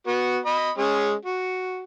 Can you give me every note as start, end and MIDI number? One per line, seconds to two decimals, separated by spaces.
0.07 0.38 59
0.07 0.38 66
0.46 0.70 75
0.46 0.70 83
0.78 1.13 56
0.78 1.13 61
0.78 1.13 68
1.25 1.82 66